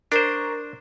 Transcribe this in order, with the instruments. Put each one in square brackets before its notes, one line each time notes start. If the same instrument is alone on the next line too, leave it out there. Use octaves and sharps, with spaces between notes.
[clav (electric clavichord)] D4 C5 [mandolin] A#4 C#5 A#5